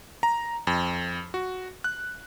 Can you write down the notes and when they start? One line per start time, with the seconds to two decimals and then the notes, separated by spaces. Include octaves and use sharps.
0.23 A#5
0.67 F2
1.34 F#4
1.84 F#6